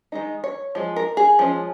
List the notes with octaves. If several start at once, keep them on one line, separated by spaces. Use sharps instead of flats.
D#3 G#3 D#4
C#5
F3 G#3
A#4
G#4
F3 G#3 C#4